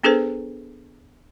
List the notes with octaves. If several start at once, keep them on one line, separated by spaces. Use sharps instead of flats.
B3 D4 G#4 A4 B4 C5